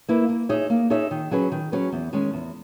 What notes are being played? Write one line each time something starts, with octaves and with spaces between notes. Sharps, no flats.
A#3 E4 B4 E5
A#3
D#4 G#4 C#5 E5
A#3
D#4 G#4 C#5 E5
D#3
F#3 C#4 G#4 B4
D#3
F#3 C#4 G#4 B4
E2
D#3 G#3 C#4
E2